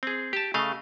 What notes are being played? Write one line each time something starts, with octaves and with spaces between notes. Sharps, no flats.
C4 G#4
G4 A5
C#3 A3 D#5 F5